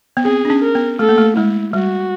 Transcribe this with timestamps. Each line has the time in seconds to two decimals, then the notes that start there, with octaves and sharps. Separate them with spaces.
0.17 B3
0.25 C4 G#4
0.45 D4
0.50 C#4
0.62 A#4
0.75 B3
0.99 A3 A4
1.09 A#3
1.18 A3
1.37 G#3 E4
1.73 G3 F#4